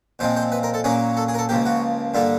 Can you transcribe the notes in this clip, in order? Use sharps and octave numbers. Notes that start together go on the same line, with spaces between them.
A#2 F3 G#3 C4 C5
C5
B4
A#4
A4
A#2 F#3 A#3 C#4 G#4
A4
G#4
A#4
A4
C#2 C#3 F3 A#3 G4
F#4
G2 D3 G3 A#3 F4